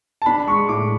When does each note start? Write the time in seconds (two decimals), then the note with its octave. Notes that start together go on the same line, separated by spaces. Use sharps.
0.22 A5
0.26 D4 B5
0.47 G#3 C#6
0.69 A2 D6